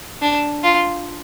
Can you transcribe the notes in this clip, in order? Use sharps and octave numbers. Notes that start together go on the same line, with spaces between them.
D4
F4